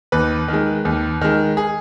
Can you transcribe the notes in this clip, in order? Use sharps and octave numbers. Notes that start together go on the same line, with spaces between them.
D#2 B4
D#3 G#3
D#2
D#3 G#3
G#4